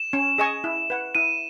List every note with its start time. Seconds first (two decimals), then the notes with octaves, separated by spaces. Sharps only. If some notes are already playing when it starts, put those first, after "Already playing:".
Already playing: E7
0.13 C#4
0.38 G#4 D#5 G#5 C#6
0.64 E4
0.90 B4 F#5
1.15 E4 D#7